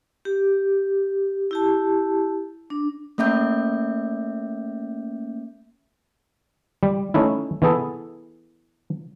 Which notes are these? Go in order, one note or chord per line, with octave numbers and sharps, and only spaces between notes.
G4
E4 G4 A5
D4
A3 A#3 C#4 E5 D6 G6
G3
A3 C#4 D#4 E4
E3 B3 E4 G#4 A4